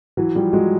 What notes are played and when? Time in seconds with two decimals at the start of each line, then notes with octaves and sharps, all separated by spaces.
0.17 E3 F#3
0.35 F3 G3
0.53 F#3 G#3